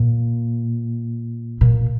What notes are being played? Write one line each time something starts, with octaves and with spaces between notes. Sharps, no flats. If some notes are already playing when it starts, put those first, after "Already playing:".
Already playing: A#2
A#2